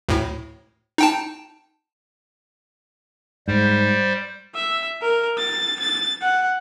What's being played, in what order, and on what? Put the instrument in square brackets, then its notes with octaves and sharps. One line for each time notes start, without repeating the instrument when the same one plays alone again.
[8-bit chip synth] D2 A2
D#4 G5 A5
[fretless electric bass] G#2 [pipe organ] G3 C5
[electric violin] E5
A#4
A6
A6
F#5